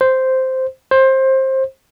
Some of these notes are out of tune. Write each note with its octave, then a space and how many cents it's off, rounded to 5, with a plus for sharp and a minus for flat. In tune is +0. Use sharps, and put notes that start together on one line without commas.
C5 -5
C5 +20